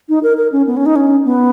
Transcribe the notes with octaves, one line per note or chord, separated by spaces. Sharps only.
D#4
A#4
A#4
C#4
B3
C#4
D#4
C#4
B3